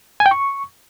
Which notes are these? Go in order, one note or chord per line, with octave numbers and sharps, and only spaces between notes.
G#5
G5
C#6